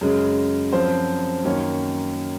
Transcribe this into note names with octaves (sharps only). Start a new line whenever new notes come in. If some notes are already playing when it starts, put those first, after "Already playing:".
F#2 C#3 G#3
F#2 F3 C4 C5
F#2 D#3 A#3 C#4 C#5